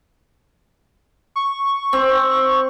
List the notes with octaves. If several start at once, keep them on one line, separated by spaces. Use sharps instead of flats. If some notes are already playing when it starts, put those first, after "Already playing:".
C#6
C4